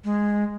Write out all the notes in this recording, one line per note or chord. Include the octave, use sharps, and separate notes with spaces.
G#3